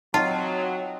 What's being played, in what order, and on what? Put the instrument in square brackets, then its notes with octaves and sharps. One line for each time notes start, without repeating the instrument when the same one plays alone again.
[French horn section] F#3 [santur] C4 D#4 D#6 [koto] F4 [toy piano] A5